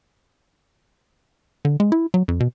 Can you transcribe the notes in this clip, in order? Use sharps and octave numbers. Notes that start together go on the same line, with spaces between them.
D3
G#3
E4
F#3
F2
B2